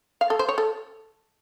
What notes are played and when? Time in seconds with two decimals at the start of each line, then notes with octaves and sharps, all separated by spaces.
0.21 F5
0.30 A4
0.39 C5
0.49 C#5
0.58 A4